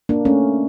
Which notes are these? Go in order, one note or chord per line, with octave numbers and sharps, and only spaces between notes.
A#3 D4
A3 C#4